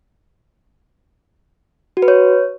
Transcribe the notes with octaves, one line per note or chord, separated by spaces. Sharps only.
F#4
B4
C#5